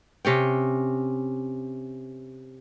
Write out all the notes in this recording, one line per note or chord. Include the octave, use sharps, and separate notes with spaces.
C3 C#4 G5